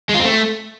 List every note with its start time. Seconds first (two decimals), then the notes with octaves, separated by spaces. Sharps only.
0.09 G#3
0.14 F4
0.19 C4
0.25 A3